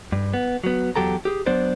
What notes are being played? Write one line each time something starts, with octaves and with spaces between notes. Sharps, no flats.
G2
B3
F#3 B3
E2 A#2 F#3 G4 A4 A#5
G4 G#4
F#3 B3 D4 C5 D5